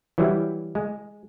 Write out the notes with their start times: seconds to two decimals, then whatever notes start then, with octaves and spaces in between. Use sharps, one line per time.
0.18 E3 F#3 G3 E4
0.75 G#3